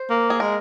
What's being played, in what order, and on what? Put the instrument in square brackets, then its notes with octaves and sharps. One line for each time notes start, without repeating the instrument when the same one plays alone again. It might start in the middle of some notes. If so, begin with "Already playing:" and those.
Already playing: [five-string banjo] C5
[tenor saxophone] A#3
[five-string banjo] G#4
[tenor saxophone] G#3 [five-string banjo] A#4